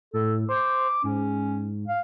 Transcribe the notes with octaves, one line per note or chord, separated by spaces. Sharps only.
A2 A4
C5 D6
G#2 C#4
F5